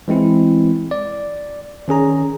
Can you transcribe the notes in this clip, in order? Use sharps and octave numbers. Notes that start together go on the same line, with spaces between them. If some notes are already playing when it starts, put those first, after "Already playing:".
E3 G#3 C4 E4
D5
D#3 C#4 G#4 A#5